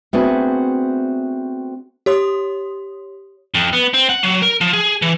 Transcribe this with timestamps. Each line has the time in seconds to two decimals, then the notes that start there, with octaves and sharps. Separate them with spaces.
0.13 A3 B3 C4 D4 F#4 G#4
2.06 G4 C#5 C6 D#6
3.54 F2
3.73 B3
3.94 C4
4.09 F#5
4.23 F#3
4.42 A#4
4.61 F3
4.73 G#4
5.02 E3